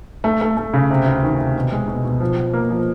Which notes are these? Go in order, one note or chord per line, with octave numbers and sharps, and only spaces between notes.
A3
A3
A3
C#3
C3
D2
D#3
C3
B2
G#3
B2
B2
F3
F3
A#3
F3